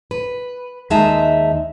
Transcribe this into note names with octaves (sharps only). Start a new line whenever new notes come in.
B4
D#2 G#3 D#4 E5 A5